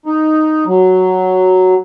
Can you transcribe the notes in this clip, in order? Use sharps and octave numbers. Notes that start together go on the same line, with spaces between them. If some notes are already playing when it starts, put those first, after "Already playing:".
D#4
F#3